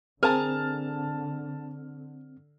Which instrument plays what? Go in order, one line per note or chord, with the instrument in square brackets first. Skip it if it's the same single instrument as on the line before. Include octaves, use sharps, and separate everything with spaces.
[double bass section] D3 [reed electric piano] C4 [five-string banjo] G#4 A#4 [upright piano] A5 F6